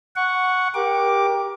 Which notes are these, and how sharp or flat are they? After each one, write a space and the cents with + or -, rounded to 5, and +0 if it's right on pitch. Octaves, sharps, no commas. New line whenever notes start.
F#5 -5 C#6 +5
G4 +15 A#4 +20 D6 +0